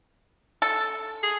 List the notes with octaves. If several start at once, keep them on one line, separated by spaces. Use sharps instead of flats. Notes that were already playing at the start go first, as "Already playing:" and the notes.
A4
G#4